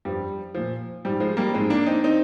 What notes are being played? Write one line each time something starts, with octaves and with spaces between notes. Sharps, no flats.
G2 F3 G3
A#2 F3
G#2 F3 G3
F3 G#3
G3 A#3
G#2 F3 G#3 C4
A#3 D4
C4 D#4
D#3 C4 D#4